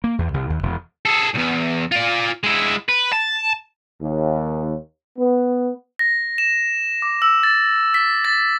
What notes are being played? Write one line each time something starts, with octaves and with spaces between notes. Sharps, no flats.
A#3
E2
C2
D#2
E1
G#4 A4
B1 E2
F4 D5
G#3 E4
B4
A5
D#2
B3
A#6
E7
D6
E6
A6
B6
A6